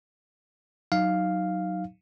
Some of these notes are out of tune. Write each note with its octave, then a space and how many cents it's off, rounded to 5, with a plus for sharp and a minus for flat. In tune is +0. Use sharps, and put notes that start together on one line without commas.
F#3 +0 D#4 +0 F5 +0